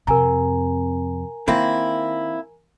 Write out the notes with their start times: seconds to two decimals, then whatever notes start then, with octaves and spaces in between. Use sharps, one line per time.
0.07 F2 C3 A#4 G#5 A#5
1.48 D#3 A#3 C4 E4